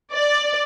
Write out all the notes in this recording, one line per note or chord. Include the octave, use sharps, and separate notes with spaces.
D5